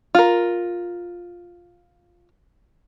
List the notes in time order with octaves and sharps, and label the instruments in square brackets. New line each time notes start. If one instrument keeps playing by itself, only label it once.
[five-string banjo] F4 A#4